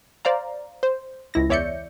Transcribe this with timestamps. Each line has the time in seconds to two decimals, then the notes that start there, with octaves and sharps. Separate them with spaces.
0.25 C5 D5 F5 A#5
0.83 C5
1.34 C#2 E4 A#6
1.49 E2 C#5 D5 E5 G6 C#7